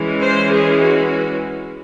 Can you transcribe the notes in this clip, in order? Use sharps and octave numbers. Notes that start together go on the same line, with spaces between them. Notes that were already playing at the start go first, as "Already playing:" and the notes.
Already playing: E3 G#3 C#4
C5
G#4
F#4